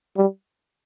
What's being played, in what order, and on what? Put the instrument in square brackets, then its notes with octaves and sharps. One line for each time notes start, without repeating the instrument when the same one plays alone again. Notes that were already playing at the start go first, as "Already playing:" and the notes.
[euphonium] G3